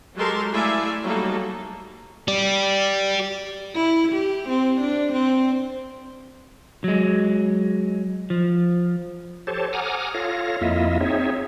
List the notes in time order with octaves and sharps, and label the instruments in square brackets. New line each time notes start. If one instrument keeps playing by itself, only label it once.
[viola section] F#3 G#3 G4 A4 A#4 C6
A3 E4 D5 E5 F5 G#5
F#3 G3 A#3 D#4 A4
[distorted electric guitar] G4 D5
[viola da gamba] E4
G4
C4
D4
C4
[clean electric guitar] F#3 G#3
F3
[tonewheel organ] G4 A4 C5 C#5 A5
F#5 G#5 A#5 D6 D#6 F6
F4 A4 C#5 F5 A#6
F2 A#3 E4 F4 D#5 E5
C4 D#4 G#4 C#5 E5